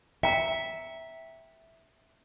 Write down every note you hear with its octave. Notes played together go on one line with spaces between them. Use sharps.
E5 G5 A#5